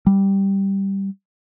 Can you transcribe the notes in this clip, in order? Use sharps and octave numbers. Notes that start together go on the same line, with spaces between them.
G3